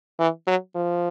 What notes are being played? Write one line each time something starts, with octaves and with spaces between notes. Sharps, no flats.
E3
F#3
F3